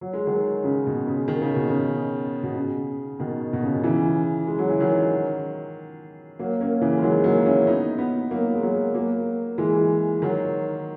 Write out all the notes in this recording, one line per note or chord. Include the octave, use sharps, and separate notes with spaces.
F#3
G#3
D#3 F#3
C#3
B2
C#3
D#3
C#3
B2
C#3
B2
C#3
B2 D#3
B2
C#3
D#3
C#3 E3
G#3
F#3
E3
D#3 F#3
F#3 A#3
A#3 C#4
C#3 E3
G#3
D#3 F#3
F#3 A#3
C#4 E4
B3 D#4
B3 D#4
F#3 A#3
G#3
F#3 A#3
F#3 A#3
E3 G#3
D#3 F#3